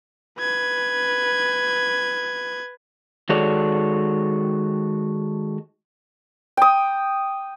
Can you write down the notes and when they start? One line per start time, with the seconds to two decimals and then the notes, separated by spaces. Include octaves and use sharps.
0.39 B4 G#6
3.29 D#3 G#3 F#4 A4 C#5 D5
6.57 G5 D#6